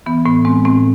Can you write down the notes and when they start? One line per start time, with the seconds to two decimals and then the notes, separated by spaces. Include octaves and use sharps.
0.06 E3 B3
0.26 A2 B3
0.45 G#3 C4
0.65 A2 C4